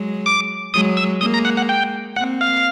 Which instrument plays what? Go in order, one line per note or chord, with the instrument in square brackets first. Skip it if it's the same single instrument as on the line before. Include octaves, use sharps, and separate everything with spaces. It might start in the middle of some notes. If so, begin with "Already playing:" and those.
Already playing: [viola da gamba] F#3 G#3
[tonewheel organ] D6
[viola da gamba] F#3 G#3 [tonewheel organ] D#6
[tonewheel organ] E6
[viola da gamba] G#3 A#3 [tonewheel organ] D#6
[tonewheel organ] A#5
F#5
F#5
G5
[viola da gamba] A#3 C4 [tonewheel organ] F#5
[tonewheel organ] F5